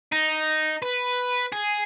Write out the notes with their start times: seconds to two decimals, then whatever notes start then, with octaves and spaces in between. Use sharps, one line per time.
0.12 D#4
0.82 B4
1.52 G#4